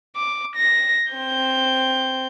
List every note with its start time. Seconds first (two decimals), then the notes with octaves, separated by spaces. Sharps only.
0.16 D6
0.56 A#6
1.12 C4 G6